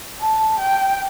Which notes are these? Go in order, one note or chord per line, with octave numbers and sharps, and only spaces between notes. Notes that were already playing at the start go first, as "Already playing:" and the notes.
A5
G5